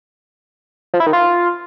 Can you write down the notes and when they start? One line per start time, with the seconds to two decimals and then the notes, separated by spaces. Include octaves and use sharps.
0.94 F3
1.00 E4
1.07 D#3
1.13 F4